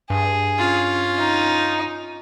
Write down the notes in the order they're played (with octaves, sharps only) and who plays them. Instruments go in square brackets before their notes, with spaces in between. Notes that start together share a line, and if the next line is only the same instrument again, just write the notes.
[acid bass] G2 [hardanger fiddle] G#4
[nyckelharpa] C#4 F4
[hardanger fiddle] D#4